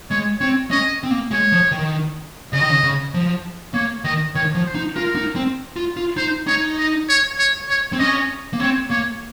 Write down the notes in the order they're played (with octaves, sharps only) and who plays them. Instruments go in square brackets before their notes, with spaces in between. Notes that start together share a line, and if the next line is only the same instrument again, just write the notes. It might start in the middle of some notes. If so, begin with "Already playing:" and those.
[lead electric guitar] G#3 [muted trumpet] C#5
[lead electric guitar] C4 [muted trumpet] C#5
[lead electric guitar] C#4 [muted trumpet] D#5
[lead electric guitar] C4
A#3
[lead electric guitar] G#3 [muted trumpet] C#5
[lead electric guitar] F3
D#3
[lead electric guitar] C#3 [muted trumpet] D#5
[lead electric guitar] D#3
C#3
C#3
F3
[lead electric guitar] A#3 [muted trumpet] C#5
[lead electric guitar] D#3 [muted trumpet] D#5
[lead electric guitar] D#3 [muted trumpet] C#5
[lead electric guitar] F3
[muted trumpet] C5
[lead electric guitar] D#4
[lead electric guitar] F4 [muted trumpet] A#4
[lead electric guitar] D#4
C4
F4
F4
[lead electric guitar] D#4 [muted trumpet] C5
[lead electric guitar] D#4 [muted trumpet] C#5
[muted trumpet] D#5
C#5
C#5
C#5
[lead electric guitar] C4
[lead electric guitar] C#4 [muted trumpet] D#5
[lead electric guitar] A#3
[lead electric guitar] C4 [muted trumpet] C#5
[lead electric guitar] A#3 [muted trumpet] C#5